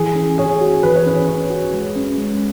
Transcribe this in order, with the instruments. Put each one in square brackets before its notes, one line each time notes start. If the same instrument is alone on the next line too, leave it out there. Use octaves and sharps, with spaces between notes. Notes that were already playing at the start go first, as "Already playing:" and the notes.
Already playing: [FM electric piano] E3 [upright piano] G#4
[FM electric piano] C#4
[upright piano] G#4 [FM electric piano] C#5
[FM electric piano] F#4
[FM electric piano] E3 [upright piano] B4
[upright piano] C#5
[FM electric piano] C#4 [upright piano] B4
[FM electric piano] C#5
F#4
G#3
C#4
G#3